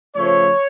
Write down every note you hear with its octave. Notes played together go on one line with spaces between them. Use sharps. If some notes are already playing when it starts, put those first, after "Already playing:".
C#3 F3 A3 C#5